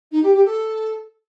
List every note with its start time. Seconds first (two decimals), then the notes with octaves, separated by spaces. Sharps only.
0.11 D#4
0.22 G4
0.34 G4
0.45 A4